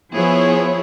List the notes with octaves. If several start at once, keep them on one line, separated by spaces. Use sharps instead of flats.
F3 B3 E4 G#4 C5 C#5